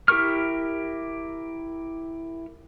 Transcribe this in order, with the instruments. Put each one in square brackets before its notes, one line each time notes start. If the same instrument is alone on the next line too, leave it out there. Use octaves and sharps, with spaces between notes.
[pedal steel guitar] E4 G4 A#4 C#6 F6